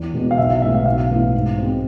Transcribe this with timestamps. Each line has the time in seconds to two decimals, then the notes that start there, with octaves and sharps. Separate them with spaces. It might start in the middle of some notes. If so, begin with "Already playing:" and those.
Already playing: E2
0.13 B2 G#3 B3
0.31 F5
0.38 B1 E5
0.49 F5
0.62 A2 G#3 B3 E5
0.74 F5
0.85 B1 F5
1.10 A2 E3 B3
1.34 G#2
1.58 G#3 C4